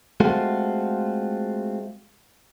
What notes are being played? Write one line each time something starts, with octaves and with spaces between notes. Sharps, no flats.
G#3 A3 C4 F4 F#4 A4